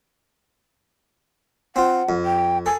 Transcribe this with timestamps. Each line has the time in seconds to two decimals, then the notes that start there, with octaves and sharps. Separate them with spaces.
1.76 C4 F4 F#5
2.09 F2
2.25 G5
2.66 A4 G#5